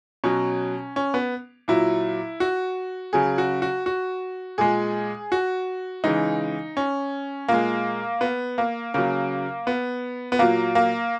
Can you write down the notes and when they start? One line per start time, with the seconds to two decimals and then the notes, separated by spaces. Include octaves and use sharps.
0.24 B2 F#3 C#4
0.96 C#4
1.14 B3
1.68 A#2 F#3 E4
2.40 F#4
3.13 C#3 F#3 G#4
3.38 F#4
3.62 F#4
3.86 F#4
4.58 A#2 G#3 G#4
5.32 F#4
6.04 C#3 E3 G#3 D#4
6.77 C#4
7.48 A#2 G#3 A#3
8.21 B3
8.58 A#3
8.94 C#3 F#3 A#3
9.67 B3
10.32 B3
10.39 A#2 F#3 A#3
10.75 A#3